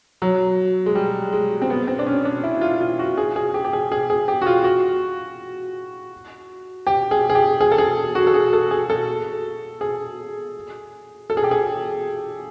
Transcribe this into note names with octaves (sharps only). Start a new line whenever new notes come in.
F#3
G#3
G3
G#3
C4
B3
C4
D4
C#4
D4
E4
F4
F4
F#4
G#4
G#4
G4
G4
G#4
G#4
G#4
G4
F#4
F4
F#4
G4
G#4
G#4
G4
G#4
A4
G#4
F#4
A4
G#4
A4
G#4
A4
G#4
A4
G#4
G4
G#4